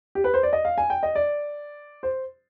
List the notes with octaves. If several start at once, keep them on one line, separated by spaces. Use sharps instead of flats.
G4
B4
C5
D5
D#5
F5
G#5
G5
D#5
D5
C5